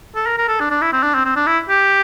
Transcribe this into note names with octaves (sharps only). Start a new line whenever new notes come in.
A4
A#4
A#4
A4
D4
D4
E4
C4
D4
C4
C4
D4
E4
G4